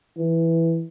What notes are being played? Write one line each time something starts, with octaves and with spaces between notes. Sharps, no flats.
E3